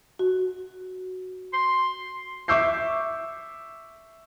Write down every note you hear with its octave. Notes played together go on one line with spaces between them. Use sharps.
F#4
C6
E5 C#6 D6 E6 G6 C7